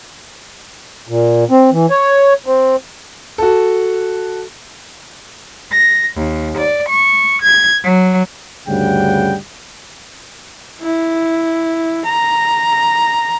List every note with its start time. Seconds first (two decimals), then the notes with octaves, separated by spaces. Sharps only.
1.09 A#2
1.51 C4
1.72 E3
1.90 C#5
2.46 C4
3.38 F#4 A4
5.70 A#6
6.16 D#2
6.58 D5
6.88 C#6
7.42 G#6
7.82 F#3
8.68 D2 G2 C#3 G3 F#5 G5
10.82 E4
12.05 A#5